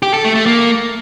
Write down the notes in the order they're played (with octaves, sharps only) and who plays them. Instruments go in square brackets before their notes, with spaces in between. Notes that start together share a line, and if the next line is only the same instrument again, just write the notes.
[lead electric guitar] G4
A4
A3
A3
A#3